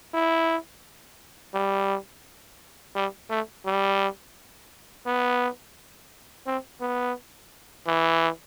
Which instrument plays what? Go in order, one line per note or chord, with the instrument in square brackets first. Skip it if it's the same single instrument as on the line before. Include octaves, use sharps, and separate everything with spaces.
[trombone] E4
G3
G3
A3
G3
B3
C4
B3
E3